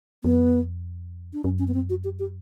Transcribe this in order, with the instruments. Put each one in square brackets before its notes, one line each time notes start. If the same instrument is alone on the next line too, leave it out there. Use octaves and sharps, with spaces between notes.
[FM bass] F2 [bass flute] B3
[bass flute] D4
[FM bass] F#2 [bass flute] C#4
[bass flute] C#4
B3
C4
F#4
G4
G4